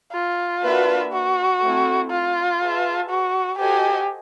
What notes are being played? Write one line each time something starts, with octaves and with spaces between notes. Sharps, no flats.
F4
A#3 D4 F#4 B4 E5
F#4
A3 C4 E4
F4
G#4 B4 E5 A5
F#4
F#4 G4 A4 C5 D#5 G#5